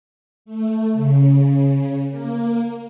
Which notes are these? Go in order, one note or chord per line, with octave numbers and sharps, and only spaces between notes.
A3
C#3
A#3